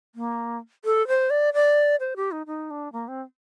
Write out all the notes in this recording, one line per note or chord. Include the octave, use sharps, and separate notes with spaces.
A#3
A4
C5
D5
D5
C5
G4
D#4
D#4
D4
A#3
C4